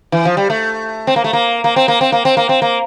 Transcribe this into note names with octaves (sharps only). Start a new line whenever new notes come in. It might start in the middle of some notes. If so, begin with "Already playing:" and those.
E3
F3
G3
A3
C4
A#3
A3
A#3
A#3
C4
A#3
C4
A#3
C4
A#3
C4
A#3